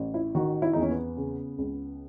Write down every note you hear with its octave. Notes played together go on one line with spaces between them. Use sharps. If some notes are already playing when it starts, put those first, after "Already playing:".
Already playing: A1
E4
D#3 F#4
E4
E2 D#4
C#4
B3
C#3
C#2